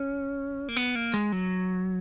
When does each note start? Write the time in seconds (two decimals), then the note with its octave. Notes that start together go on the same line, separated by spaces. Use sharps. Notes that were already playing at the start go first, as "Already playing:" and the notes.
Already playing: C#4
0.69 A#3
0.76 B3
0.95 A#3
1.14 G#3
1.32 F#3